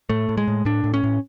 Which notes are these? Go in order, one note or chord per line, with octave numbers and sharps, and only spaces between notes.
A2 A3
A2
G#3
A2
A2 D4
A2
C#4
A2